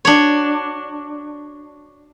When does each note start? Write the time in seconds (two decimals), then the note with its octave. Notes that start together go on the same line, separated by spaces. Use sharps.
0.05 D4 F#4 C#5